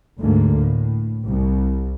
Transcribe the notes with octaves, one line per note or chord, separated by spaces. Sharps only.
D2 G#2 D3 A#3
A2
C2